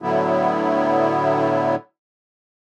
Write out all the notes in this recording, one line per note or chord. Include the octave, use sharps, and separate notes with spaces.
A2 D3 F#3 B3 E4